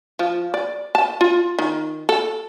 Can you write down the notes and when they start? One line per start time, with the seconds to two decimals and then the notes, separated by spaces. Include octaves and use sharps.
0.19 F3
0.54 D5
0.95 A5
1.21 F4
1.59 D#3
2.09 A4